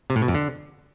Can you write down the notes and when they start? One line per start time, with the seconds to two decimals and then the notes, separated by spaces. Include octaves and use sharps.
0.10 C3
0.16 A2
0.22 B2
0.28 F2
0.34 D3